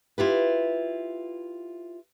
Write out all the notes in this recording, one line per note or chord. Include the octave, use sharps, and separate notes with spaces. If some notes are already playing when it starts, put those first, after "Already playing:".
E4 F4 G4 B4